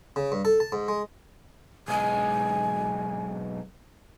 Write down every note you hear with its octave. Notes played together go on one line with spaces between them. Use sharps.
C#3
G2
A4
A5
G#2
G#3
B1 G#3 G#5